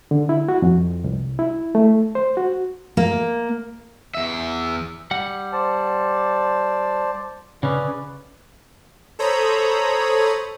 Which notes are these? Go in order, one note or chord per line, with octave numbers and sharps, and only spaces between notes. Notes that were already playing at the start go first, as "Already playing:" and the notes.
D3
E4
F#4
F2
C2
E4
A3
C5
F#4
A#3
E2 E5
G3 F#5
C5 D5 A5
C#3 C#4 G#4 B4 D5
A4 C5 C#5 A#5 B5 D#6